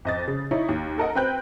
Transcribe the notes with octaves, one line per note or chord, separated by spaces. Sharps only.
F2 D#5 A6
C#3
D#4 E4 C#5
D#2
A4 A#4 D#5 F#5
C4 B4 G5 F#6 G6